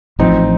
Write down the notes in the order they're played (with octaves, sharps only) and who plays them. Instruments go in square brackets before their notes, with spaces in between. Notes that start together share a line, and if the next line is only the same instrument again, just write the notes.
[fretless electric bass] A1 A2 F3 [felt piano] C4 D#4